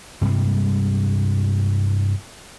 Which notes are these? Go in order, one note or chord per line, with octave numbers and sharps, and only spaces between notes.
G2 C3 G3 G#3